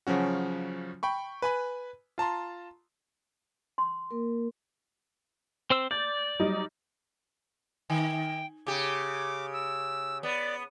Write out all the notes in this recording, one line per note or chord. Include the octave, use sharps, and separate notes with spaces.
C#3 F3 F#3 C#4 F#4
G5 B5 C#6
B4 G#5 B5
F4 A5 A#5 C6
C6
A#3 A#4
C4 C5 E6
D5 G6 A6
F#3 G3 D#4
D#3 G5
C#3 G4 D6
E6
B3 D5